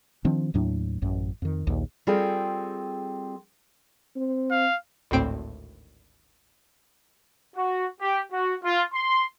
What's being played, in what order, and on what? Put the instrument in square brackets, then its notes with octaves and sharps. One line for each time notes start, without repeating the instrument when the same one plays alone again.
[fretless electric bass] D#3 F3 C4 D4
D#2 A2 F#3 D4
A1 F#2
F2 D#3
A#1 D#2
[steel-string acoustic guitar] G3 C4 F4 G#4 A4 G5
[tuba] C4
[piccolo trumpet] F5
[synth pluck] G#1 D2 A2 C4 D7
[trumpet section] F#4
G4
F#4
F4
C6